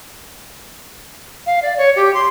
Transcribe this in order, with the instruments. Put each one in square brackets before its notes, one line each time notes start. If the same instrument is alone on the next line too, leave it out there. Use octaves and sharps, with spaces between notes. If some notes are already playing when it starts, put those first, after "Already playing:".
[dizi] F5
D5
C#5
G4
C6